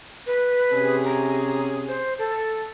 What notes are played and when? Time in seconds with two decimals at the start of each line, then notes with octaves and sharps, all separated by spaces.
0.27 B4
0.72 C3 C#4 G#4
1.05 A#5
1.88 C5
2.19 A4